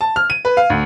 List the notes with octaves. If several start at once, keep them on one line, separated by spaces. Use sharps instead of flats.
A5
F6
D#7
B4
F5
D2